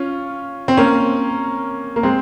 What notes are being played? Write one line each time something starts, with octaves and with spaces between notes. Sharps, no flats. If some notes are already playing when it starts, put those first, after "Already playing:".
Already playing: C#4 F4
C4
A#3 C#4
A#3
G#3 C4